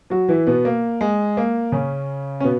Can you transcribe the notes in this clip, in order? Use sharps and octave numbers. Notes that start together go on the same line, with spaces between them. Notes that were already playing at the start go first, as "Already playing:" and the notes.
F#3 F#4
E3 E4
B2 B3
A#3
G#3
A#3
C#3 C#4
C#4
B2 B3